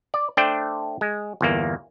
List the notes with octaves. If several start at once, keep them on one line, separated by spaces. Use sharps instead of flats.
D5
A3 D4 C5 D5 G5
G#3
G1 E2 A#3